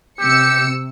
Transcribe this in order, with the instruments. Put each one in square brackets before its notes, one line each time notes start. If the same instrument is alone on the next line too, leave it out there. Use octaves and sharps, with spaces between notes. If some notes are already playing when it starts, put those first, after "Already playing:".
[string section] C3 E6 C#7 [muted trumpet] G4